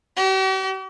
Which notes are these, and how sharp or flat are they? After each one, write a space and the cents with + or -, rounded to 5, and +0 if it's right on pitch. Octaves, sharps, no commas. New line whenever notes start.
G4 -45